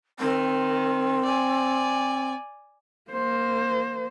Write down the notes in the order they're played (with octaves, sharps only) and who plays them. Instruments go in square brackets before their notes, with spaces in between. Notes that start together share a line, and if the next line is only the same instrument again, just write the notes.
[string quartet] D#3 [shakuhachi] C4
[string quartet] D5 G#5
[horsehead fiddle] A#3 C5